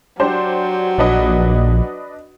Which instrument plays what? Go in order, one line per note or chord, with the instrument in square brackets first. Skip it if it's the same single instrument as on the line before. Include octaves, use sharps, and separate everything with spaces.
[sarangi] F#3 [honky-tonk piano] D4 G4 C5
[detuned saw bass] A#1 [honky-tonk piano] D4 B4 D#5